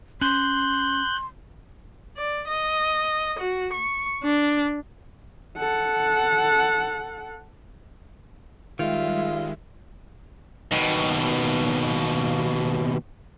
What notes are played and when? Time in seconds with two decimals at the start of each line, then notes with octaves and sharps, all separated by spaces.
0.21 C#4 C6 F#6 G6
2.17 D5
2.48 D#5
3.39 F#4
3.73 C#6
4.23 D4
5.57 A4 F#5
8.79 D#3 G3 G#3 F4 E5
10.72 D#2 B2